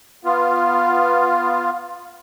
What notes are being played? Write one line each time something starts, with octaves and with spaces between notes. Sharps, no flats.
B3 F4